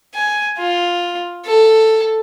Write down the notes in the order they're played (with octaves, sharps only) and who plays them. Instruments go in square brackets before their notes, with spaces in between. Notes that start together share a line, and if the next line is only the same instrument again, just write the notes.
[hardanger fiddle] G#5
F4
A4